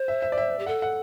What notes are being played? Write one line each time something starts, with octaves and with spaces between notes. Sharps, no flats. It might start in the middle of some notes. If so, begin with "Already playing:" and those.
Already playing: C5
E5
E5
D5
E5
G4
A4 F#5
F#5